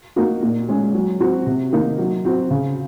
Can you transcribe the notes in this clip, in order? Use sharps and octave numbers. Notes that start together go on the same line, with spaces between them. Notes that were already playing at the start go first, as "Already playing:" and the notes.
A#3 D#4 F#4
A#2
G#3 C#4 G#4
F#3
C4 F#4
C3
D#3 A#3 D#4
F#3
C4 F#4
C#3